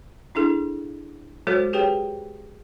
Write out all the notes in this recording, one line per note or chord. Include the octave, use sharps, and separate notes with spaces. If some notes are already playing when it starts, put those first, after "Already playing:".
D4 E4 G#4 A4
F#3 G#3 F#4 A4 C5 C#5
G4 G#4 B4 C#5 G5